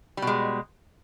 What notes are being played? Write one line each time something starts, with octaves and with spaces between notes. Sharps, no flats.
B2 G3 G#3